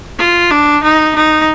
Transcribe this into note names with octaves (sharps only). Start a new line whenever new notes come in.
F4
D4
D#4
D#4